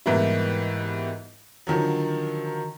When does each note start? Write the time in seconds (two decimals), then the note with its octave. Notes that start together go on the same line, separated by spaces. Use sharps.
0.06 G#2 B2 E3 G3 A#3 E4
1.67 D3 D#3 F3 F#3